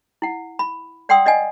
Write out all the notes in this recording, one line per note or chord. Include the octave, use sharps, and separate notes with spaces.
E4 F#5
B5
D5 F#5 G5 C6 D#6 E6
D5 D#5 F#5 G#5